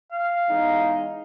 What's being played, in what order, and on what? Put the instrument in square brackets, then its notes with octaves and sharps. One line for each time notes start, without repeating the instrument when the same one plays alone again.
[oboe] F5
[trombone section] E2 G#3 D#4